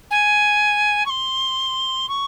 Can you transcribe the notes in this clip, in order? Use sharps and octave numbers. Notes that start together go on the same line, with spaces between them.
G#5
C#6
C6
C#6